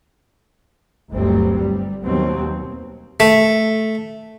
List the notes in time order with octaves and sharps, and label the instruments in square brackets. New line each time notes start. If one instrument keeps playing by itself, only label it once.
[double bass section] G1 D2 F#3 G3 C4
G3
D#2 B2 F#3 C4
[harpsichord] A3